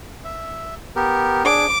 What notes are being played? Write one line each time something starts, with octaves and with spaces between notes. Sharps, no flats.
E5
B3 G4 A#4
D4 G#4 D6